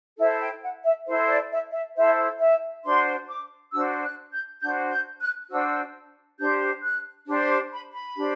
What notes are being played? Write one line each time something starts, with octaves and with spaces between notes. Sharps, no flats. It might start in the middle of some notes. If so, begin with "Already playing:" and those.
E4 A4 C5 E5
G5
F#5
E5
E4 A4 C5
D5
E5
E5
E4 A4 C5 E5
E5
D4 F#4 C5 C6
D6
D4 F#4 C5 E6
F#6
G6
D4 F#4 C5 G6
G6
F#6
D4 F#4 C5 E6
D4 G4 C5 G6
F#6
D4 G4 C5
D6
B5
B5
D4 G4 C5